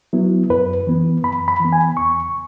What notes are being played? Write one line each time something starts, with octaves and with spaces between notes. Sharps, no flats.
F#3 B3 E4
F#2 B4
E3 B3
F#2 B5
B5
E3 B3
G#5
E2 C#6